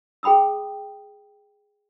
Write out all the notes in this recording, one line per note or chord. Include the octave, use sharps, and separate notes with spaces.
G#4 G5 B5 D#6 E6